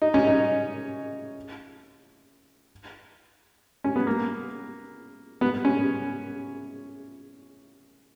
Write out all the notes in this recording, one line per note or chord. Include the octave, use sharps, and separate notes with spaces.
D#4
C#4
D#4
C#4
B3
A#3
B3
C#4